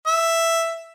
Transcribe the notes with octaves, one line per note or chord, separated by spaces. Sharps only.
E5